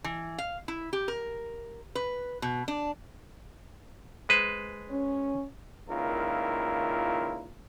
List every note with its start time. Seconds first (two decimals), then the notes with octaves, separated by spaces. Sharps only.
0.04 E3
0.38 F5
0.68 E4
0.93 G4
1.08 A#4
1.95 B4
2.42 B2
2.68 D4
4.29 G#3 B4 C5
4.90 C#4
5.90 C#2 A#2 D#3 E4 F4 A#4